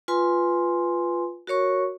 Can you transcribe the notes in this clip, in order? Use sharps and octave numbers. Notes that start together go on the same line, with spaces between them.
F4 B4 G#5 C6
F#4 A#4 C#5 C#6